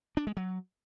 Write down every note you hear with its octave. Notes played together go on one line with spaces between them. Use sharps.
D4
G#3
F#3